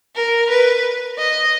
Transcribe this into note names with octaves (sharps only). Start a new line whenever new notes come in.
A#4
B4
D#5